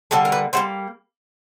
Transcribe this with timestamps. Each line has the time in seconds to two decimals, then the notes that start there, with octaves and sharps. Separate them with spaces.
0.11 D3 G3 A#3 A4
0.25 A#4
0.32 B4
0.53 D3 G3 A#3 C5